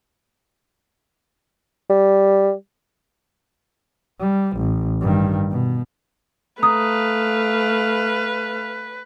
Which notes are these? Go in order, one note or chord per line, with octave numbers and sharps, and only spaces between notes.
G3
G3
A1
G2 D#3
B2
A3 B4 F5 A#5 D#6